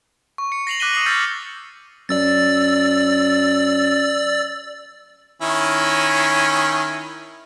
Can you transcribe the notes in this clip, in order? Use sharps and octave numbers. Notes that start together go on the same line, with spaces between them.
C#6
C#7
A#6 C7 F7 F#7
D6 F#6 A#6 B6 D#7 G7
D#6 C7 F#7
C#6 E6 F6 G6 A6 C#7
F#2 D5 E6 A6
D#3 C#4 E4